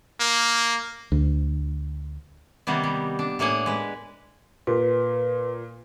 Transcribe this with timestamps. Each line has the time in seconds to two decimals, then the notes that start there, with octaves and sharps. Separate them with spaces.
0.20 A#3
1.12 D2
2.67 C3 D#3 G3 A#3 B3
2.83 G3
3.19 D4
3.39 A2 A#3 D4 F#5 G#5
3.66 G#3 B4
4.67 A#2 B4